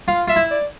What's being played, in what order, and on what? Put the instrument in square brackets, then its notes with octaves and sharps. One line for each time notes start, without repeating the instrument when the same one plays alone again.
[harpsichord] F4 [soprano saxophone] F5
[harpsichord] F4 [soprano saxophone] E5
[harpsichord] E4
[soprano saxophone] D5